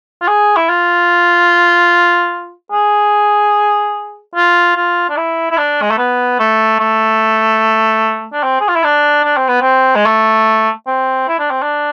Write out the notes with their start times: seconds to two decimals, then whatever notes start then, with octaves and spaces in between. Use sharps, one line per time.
0.21 F4
0.28 G#4
0.57 E4
0.69 F4
2.72 G#4
4.35 F4
4.76 F4
5.10 D4
5.17 E4
5.51 E4
5.58 D4
5.82 G#3
5.91 A3
5.98 B3
6.39 A3
6.79 A3
8.33 D4
8.43 C4
8.61 G#4
8.69 F4
8.75 E4
8.84 D4
9.24 D4
9.37 C4
9.48 B3
9.61 C4
9.96 G#3
10.06 A3
10.87 C4
11.28 E4
11.39 D4
11.51 C4
11.62 D4